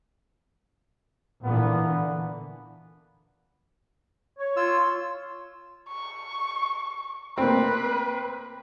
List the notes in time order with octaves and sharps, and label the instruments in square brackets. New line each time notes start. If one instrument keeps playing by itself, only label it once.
[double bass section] A#2 D3 E3 [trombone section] A#3 B3
[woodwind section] C#5
[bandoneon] F4 E6
[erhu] C#6
[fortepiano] A#3 C4 [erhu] B4